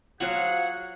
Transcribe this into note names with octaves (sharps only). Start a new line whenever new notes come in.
F#3 F4 F#4 G#4 C5 F5 F#5